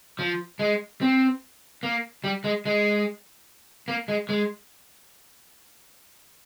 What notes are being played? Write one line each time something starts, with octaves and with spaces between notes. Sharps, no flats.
F3
G#3
C4
A#3
G3
G#3
G#3
A#3
G#3
G#3